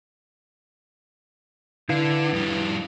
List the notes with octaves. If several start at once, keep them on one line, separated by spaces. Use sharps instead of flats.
D3 E4 B4 F5
F2 G3